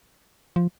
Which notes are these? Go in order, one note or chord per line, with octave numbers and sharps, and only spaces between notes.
F3